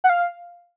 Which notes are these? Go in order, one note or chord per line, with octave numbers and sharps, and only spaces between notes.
F#5
F5